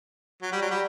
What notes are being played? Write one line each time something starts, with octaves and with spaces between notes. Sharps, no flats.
F#3
G3
F#3
G3